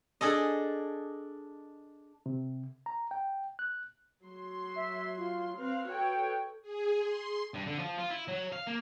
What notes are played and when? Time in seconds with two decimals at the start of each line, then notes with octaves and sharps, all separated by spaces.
0.21 D4 G#4 A4 D#5
2.26 C3
2.86 A#5
3.11 G5
3.59 F#6
4.24 F#3 C6
4.76 E5
5.17 F4
5.58 C4 B4 F5
5.88 F#4 A4 C#5 G5
6.62 G#4
6.98 C6
7.54 G2
7.67 D3
7.79 F3
7.98 F4
8.10 E4
8.28 F#3
8.52 F5
8.67 A#3